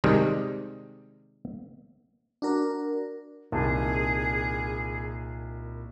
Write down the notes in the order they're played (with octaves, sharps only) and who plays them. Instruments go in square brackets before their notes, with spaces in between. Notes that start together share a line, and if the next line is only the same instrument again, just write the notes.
[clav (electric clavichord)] C3 D#3 G3 G#3
[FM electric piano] D4 F#4 A#4
[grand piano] C2 D#3 A5 [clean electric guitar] A#2 [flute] G#4